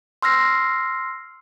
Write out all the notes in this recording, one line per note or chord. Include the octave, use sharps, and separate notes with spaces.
C6 E6 F6 A#6 C7